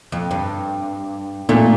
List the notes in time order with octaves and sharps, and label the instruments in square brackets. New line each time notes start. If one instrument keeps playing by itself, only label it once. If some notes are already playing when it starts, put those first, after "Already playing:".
[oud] F2
G2
[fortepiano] A#2 [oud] A3